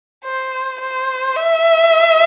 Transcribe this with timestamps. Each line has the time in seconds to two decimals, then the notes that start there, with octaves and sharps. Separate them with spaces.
0.25 C5
0.81 C5
1.37 E5